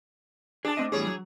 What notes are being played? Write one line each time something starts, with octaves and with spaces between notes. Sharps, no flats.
D4 G#4 A5
A3 C4 D#5
E2 A2 G3 G#4 C#5
F#3